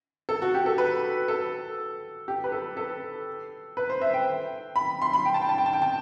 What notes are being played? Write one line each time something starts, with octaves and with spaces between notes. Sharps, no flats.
A4
F#4
G4
A4
B4
A4
G4
B4
A4
A4
B4
C5
E5
G5
B5
C6
B5
G5
A5
G5
A5
G5
A5
G5
A5